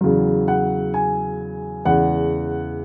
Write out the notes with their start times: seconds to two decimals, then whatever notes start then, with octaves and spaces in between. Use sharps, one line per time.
0.01 E2 C#3 F#3
0.48 F#5
0.94 G#5
1.85 E2 C#3 G#3 F#5